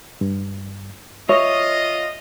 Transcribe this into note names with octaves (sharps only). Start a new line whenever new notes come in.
G2
F4 C#5 D#5 E5